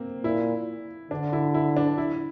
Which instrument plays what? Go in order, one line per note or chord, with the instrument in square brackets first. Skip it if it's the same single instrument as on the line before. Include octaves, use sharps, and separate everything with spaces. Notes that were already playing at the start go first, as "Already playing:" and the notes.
Already playing: [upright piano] A#3 C4
[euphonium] A#2 [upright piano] E4
[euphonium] D3 [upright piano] D4
[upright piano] E4
E4
D4
E4